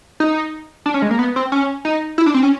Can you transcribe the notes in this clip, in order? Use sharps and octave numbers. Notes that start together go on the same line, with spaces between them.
D#4
D4
C#4
G#3
A#3
B3
C4
C#4
D#4
E4
D4
C4
C#4